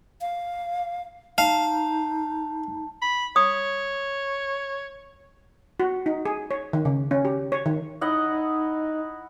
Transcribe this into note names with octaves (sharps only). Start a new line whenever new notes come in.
F5
D#4 F5 A5
B5
C#5 D#6
F#4
D#4
G#4
C#5
D#3
C#3
C#4
G4
C#5
D#3
D#4 E4 D#5 F#5
D#4